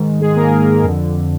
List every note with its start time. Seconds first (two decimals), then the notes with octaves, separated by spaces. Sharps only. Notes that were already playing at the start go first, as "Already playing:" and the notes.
Already playing: G#2 D#3
0.20 G#3 G#4
0.36 A#3 A#4
0.84 F2 D3